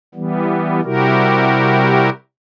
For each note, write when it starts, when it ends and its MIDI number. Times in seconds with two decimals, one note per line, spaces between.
0.15 0.81 52
0.15 0.81 55
0.15 0.81 59
0.84 2.10 48
0.84 2.10 55
0.84 2.10 64
0.84 2.10 66
0.84 2.10 67
0.84 2.10 70